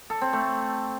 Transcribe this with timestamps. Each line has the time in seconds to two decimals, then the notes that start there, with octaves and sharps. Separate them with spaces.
0.10 A4
0.21 C4
0.33 A3